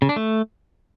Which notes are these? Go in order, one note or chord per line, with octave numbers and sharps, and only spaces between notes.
C#3
D4
A3